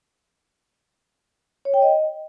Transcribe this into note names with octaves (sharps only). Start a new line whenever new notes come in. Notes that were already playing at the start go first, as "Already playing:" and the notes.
C#5
G5
D#5